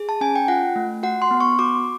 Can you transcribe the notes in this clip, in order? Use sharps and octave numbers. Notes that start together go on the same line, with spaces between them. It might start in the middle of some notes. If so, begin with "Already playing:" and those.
Already playing: G#4
A5
C#4 G#5
G5
F4 F#5
A3
F#4 F#5
C6
B3
C#6
F#4 D6